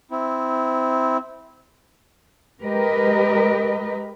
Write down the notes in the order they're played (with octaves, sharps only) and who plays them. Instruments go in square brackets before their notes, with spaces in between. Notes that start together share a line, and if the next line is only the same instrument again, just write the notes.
[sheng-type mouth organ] C4 E4
[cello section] G#3 G4 A#4 B4 D#5